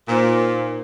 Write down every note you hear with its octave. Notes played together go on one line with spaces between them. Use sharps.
A#2 A#3 D#4 C5